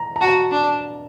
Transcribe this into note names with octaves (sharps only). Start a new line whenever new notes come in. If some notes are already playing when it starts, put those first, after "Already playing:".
Already playing: A#5
A#5
F#4 A5
D4